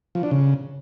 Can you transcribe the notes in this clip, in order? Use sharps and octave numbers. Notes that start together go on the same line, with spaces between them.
F3
D4
C#3